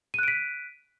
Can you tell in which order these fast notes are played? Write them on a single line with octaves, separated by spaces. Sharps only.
D#7 F#6 D7 B6